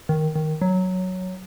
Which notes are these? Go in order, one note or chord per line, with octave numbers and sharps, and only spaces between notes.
D#3
D#3
F#3